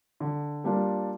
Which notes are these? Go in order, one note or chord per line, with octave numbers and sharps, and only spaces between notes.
D3
G3 A#3 D4 F4